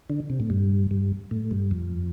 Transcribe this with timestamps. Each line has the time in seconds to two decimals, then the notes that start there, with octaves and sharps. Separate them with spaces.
0.10 D3
0.30 C3
0.40 A2
0.50 G2
0.91 G2
1.31 A2
1.51 G2
1.71 F2